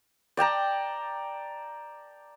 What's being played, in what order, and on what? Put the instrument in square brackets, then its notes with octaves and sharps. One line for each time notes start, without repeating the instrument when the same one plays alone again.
[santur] D5 G5 A5 A#5